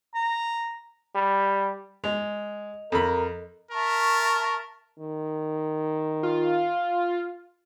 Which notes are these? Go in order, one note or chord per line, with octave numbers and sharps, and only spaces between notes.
A#5
G3
G#3 D#5 F7
F2 A4 A#4 B5
A#4 E5 A5 C#6
D#3
F4